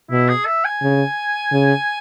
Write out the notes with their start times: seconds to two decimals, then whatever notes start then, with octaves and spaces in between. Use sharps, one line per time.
0.11 B2 E4
0.29 G#4
0.46 E5
0.64 G#5
0.82 C#3
1.52 C#3